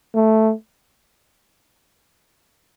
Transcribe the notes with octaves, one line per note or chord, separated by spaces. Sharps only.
A3